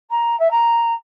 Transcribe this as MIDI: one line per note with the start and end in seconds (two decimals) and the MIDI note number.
0.10 0.38 82
0.39 0.50 76
0.51 0.93 82